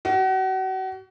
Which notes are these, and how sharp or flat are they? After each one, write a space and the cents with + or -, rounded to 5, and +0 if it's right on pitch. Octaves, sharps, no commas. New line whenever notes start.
F#4 +35